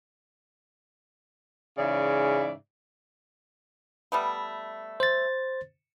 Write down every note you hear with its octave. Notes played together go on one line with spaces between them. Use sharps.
G#2 C#3 E3 D5 E5
G3 A3 B3
C5 A6